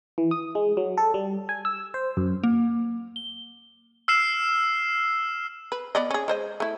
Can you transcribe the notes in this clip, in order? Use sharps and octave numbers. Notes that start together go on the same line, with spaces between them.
E3
D#6
G#3
F#3
A4
G3
G#5
E6
C5
F#2
A#3
G7
E6 F6 C7 E7
B4
B3 D5 D#5
C#4 G#4
G#3 C5 D#5
A3 E4